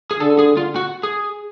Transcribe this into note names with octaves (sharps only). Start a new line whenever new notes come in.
G#4
D3 A4
G#4
F4
F#4
G#4